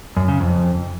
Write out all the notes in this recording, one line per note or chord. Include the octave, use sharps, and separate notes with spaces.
F#2
C#3
F2